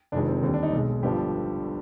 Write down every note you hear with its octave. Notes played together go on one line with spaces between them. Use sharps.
F1 F2 D#3 G#3 D4
C4
D#2 D3 G3 C4
D4
D#4
B1 B2 G#3
G1 G2 D3 F3 G4